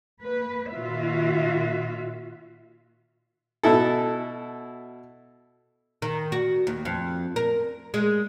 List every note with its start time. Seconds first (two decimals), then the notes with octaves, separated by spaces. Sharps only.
0.22 A#3 B4
0.72 A#2 D#3 F4 F#4 E5 F5
3.63 B2 E4 A4
6.02 D#3
6.32 F#4
6.67 D#2
6.85 F2
7.36 A#4
7.94 G#3